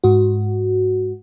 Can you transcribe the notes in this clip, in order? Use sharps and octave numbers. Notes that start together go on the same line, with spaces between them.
G#2 F#4